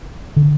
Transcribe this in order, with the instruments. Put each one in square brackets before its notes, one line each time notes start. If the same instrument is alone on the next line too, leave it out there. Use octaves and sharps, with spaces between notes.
[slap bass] D3